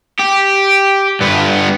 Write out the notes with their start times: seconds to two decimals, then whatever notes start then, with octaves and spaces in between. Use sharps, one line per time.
0.19 G4
1.20 G2 B3